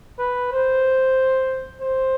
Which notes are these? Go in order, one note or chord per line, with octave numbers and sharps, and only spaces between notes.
B4
C5
C5